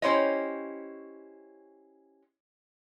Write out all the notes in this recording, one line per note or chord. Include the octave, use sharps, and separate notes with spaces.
C#4 E4 G4 C5 C#5 D#5